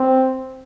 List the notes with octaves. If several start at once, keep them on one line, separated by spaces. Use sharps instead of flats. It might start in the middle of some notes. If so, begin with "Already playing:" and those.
Already playing: C4